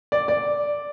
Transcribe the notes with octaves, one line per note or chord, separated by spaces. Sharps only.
D5
D5